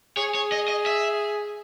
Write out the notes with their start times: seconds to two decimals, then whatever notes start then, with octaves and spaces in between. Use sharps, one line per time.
0.17 G#4 C#5
0.35 C#5
0.52 D#5
0.68 D#5
0.86 E5